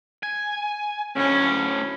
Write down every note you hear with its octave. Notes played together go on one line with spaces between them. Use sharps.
G#5
D2 A2 C#4